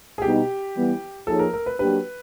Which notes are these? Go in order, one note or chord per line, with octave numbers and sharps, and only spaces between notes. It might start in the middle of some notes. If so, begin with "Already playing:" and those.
G#4
B2 G3 B3 D#4 G4
E3 G3 B3
F3 A#3 D#4 G#4 A4 C#5
A#4
A#4
B4
F#3 A#3 D4 G4 B4